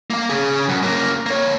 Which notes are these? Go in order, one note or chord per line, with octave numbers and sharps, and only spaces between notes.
A#3 F5
C#3 G#4
F#2
C#3 A#3
A#3 C#5